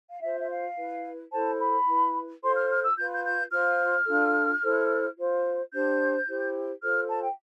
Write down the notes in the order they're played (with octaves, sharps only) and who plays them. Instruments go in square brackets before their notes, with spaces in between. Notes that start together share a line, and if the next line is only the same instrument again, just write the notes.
[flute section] F5
F4 C5 E5
E5
F5
E4 B4
E4 A4 C5 A5
B5
E4 B4
F4 A4 C5 C6
F6
F6
E6
F4 G6
B4
G6
G6
F4 C5 F6
D4 F4 A4
E4 A4 C5
F4 C5
D4 G4 C5 G6
E4 G4 C5
F4 A4 C5 F6
A5
G5